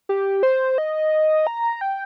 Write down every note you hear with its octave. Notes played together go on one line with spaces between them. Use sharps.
G4
C5
D#5
A#5
G5